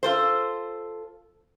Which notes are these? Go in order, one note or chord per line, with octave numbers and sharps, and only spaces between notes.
F4 A4 C5